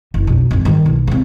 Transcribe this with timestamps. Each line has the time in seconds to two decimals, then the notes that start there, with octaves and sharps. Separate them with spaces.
0.14 F#1 D#3
0.27 B1 F2
0.51 G#1 F#2
0.65 D#3 G3
0.86 B1
1.08 C#3 C4